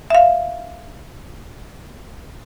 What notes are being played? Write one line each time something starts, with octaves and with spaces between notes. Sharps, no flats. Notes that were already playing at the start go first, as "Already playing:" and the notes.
E5 F5